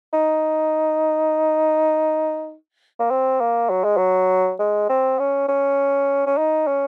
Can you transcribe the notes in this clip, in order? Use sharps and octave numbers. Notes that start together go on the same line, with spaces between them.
D#4
A#3
C4
A#3
F#3
G#3
F#3
G#3
C4
C#4
C#4
C#4
D#4
C#4